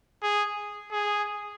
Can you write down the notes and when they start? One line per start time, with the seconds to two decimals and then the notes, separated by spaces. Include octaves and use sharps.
0.22 G#4
0.92 G#4